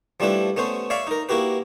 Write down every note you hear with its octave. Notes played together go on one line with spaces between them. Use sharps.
F3 G3 A3 D4 E4 B4
A3 B3 C#4 C5
C#5 D5 E5 F5 B5
D#4 A#4
A#3 E4 F#4 G4 B4